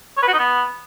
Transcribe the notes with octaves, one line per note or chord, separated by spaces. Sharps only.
C#5
B4
F#4
D#4
B3